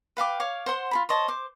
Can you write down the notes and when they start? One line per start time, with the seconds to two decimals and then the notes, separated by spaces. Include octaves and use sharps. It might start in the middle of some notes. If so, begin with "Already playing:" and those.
0.17 B4 F5 G5 D6
0.40 C#5 F5 D6
0.66 C5 F#5 C6
0.91 F4 G#4 B5
1.09 C5 C#5 D#5 A5
1.28 C5 D6